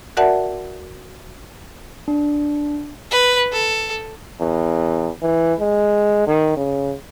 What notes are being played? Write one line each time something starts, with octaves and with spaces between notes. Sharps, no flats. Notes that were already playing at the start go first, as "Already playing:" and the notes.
F#4 A#4 D5 E5 F#5 A5
D4
B4
A4
E2
E3
G#3
D#3
C#3